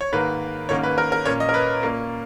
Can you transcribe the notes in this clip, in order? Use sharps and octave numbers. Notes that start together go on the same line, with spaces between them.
C#5
G#2 D#3 A#3 B4
G#2 D#3 A#3 C#4 C#5
B4
A#4
A#4
A#2 A#3 C#4 C#5
D#5
A#4
B4
A#2 A#3 C#4